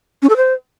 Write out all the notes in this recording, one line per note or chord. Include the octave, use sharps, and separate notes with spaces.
C#4
A4
C5